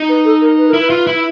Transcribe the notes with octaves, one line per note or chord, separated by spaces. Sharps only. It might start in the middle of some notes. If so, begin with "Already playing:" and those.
Already playing: D#4
B4
A4
A#4
B4
A#4
E4
B4
F4
E4